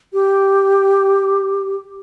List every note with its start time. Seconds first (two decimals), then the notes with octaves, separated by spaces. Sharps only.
0.13 G4